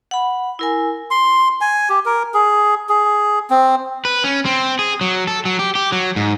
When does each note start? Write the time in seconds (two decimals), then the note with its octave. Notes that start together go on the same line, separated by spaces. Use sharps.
0.11 F#5 B5
0.59 E4 A#4 G#5
1.11 C6
1.61 G#5
1.90 G4
2.06 A#4
2.34 G#4
2.89 G#4
3.50 C4
4.05 B4
4.24 C#4
4.45 C4
4.79 G#4
5.01 F#3
5.27 A4
5.45 F#3
5.59 G4
5.75 G4
5.92 F#3
6.16 G#2